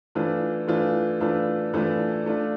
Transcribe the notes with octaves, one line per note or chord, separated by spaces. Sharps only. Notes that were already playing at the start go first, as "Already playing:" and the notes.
E3 A3 D4 F4
E3 A3 D4 F4
E3 A3 D4 F4
E3 A3 D4 F4
A3 D4 F4